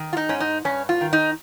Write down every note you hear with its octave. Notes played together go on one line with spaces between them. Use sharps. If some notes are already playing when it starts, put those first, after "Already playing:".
Already playing: D#3
F4
D#4
G#2 C#4
D#4
G2 C#4
F4
D#3
D#4